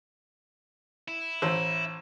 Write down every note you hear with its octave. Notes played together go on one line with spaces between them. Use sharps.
E4
A1 C5 E6